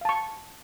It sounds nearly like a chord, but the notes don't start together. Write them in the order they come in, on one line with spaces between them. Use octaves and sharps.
F5 A5 C#6